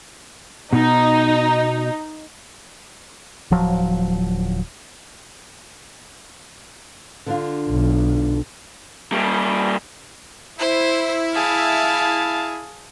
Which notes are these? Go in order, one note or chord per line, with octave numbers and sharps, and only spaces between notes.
B2 D#4
D1 F3 F#3
D3 D4 F4
B1
G3 A#3
E4 C5
G#4 F5 A5